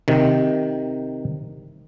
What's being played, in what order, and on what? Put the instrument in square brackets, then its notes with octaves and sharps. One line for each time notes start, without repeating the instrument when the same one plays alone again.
[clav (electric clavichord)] C3 D#3